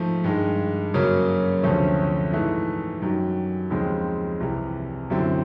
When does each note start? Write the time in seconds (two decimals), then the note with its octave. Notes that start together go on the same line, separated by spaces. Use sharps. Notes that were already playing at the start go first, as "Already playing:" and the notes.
Already playing: G#2 F3 A3
0.24 G2 D#3 G#3
0.94 F#2 C#3 F#3 A#3 C#4
1.63 D2 C3 F3 A3 C#4
2.32 G#2 E3 A3
3.02 F#2 D#3 G3
3.70 D#2 C#3 F3 G#3 C4
4.40 C2 C3 E3 G3
5.10 F#2 D3 G3 C4 E4